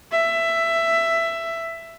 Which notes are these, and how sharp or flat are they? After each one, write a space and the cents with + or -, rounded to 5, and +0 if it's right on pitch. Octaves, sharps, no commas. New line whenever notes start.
E5 +10